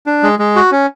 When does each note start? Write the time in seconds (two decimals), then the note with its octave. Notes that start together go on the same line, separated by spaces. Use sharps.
0.07 D4
0.23 G#3
0.39 G#3
0.56 F#4
0.72 C#4